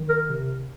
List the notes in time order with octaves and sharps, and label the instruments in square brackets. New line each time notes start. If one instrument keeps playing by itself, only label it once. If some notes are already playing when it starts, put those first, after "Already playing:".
Already playing: [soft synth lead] D#3
[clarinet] A#4
[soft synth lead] C3